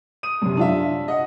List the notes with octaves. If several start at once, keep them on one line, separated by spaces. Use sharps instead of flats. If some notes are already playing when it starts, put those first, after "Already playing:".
D#6 D#7
F#2 C3
D4 F4 E5
D#5 F#5